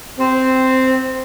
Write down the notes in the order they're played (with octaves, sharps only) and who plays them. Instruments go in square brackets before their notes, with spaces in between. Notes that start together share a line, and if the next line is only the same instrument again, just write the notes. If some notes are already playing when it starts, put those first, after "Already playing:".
[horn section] C4